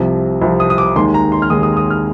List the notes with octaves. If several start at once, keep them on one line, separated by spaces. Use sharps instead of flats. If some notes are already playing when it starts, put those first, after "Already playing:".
Already playing: C2 C3 F3
C2 C3 F3
D#6
D#6
D6
D#2 D#3 G#3 C6
A#5
C6
F6
D#2 D#3 G#3 D#6
D#6
D#6
F6